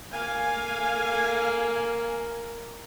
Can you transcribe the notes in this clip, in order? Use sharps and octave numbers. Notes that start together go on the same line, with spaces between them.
A3 A#3 F5 G#5